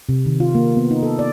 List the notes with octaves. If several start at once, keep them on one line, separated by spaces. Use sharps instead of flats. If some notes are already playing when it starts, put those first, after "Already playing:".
C3
D#3
F4
A#3
B3
D#4
A4
D5